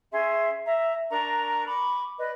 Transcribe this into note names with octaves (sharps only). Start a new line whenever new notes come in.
C#4 G#4 E5 C6
E5 A#5
D4 A#4 A#5 C#6
B5 C#6 D6
B4 D5 D#5